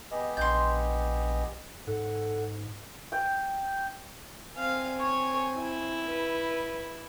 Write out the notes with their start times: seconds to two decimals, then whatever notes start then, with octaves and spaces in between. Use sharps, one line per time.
0.11 B3 G4 G#4 D#5
0.37 A#1 D#5 C6 G6
1.87 G#2 A4 F#5
3.12 G5
4.57 C4 F5 G#5
5.00 C#5
5.58 E4
6.06 B4